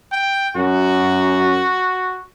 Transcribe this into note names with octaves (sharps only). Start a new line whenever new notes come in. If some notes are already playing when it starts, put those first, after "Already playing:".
G5
F#2 F#4